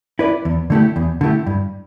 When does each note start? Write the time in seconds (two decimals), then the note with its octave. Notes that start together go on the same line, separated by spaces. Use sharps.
0.19 E4 B4 D5
0.45 E2
0.70 D3 A3 E4 G4
0.96 E2
1.21 D3 A3 E4 G4
1.46 G2